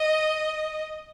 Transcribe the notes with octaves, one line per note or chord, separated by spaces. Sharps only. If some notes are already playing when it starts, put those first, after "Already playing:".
Already playing: D#5